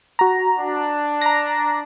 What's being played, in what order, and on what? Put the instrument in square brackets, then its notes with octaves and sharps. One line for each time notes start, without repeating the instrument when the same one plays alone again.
[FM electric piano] F#4 A#5
[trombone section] D4
[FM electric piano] A#5 A#6